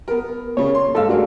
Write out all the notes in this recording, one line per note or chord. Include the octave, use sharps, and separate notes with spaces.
B3 A#4
A#2 C#3 C#5
C6
G#2 A4 F5 E6
A3 D4 F#4 G#4 A#4